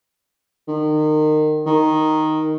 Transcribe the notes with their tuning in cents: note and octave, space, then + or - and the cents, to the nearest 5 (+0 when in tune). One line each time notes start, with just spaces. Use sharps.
D#3 -25
D#3 +0